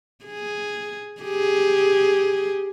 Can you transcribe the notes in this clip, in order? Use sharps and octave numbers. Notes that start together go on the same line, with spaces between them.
G#4
G4 G#4